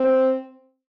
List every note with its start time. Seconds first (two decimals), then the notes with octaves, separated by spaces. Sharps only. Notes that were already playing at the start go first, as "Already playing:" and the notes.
Already playing: C4